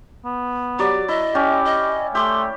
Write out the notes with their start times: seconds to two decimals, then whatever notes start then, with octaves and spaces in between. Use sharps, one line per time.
0.25 B3
0.79 F#3 G4 D5
1.08 E4 D#5
1.35 C#4 G4 D5 G5
1.65 D#5
2.15 A3 G4 C6